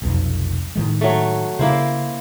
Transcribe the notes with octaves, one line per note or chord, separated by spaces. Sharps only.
F1 B1 F2
A2 D#3 G#3
F#3 A3
C#3 A#3 E4 C5